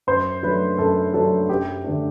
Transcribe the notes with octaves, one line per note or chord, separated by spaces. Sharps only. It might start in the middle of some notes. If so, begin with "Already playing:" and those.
F#2 C5
F#3 A3 D4 B4
F#2 A4
F#3 A3 D4 A4
F#2 G4
D3 A3 D4